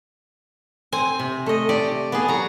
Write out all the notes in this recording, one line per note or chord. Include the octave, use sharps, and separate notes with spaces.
C4 G#5
C3
A3 D#5
G4 D5
B3 G#4
F#3 A#5